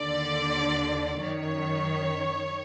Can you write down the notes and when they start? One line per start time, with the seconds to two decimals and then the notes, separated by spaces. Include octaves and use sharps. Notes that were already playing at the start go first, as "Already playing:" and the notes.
Already playing: D#2 D3 D5
1.20 F#2 D#3 C#5